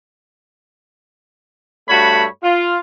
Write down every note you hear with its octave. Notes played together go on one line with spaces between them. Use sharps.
G2 A3 F#4 C#5 A5 B5
F4